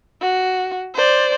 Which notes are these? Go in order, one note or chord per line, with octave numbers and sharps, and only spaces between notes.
F#4
C5 D5